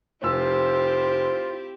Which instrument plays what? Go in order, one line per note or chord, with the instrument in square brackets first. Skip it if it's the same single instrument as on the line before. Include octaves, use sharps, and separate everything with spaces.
[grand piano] F1 E6 [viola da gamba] C4 E4 G4 [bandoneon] F4 [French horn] C5